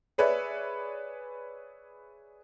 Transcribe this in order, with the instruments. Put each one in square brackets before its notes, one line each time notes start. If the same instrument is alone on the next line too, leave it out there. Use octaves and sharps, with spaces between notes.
[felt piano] G#4 B4 C#5 D5 E5